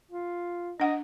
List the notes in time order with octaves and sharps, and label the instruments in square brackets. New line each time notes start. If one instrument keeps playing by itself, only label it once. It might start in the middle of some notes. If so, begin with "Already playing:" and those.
[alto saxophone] F4
[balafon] D4 F#5 [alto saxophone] D#5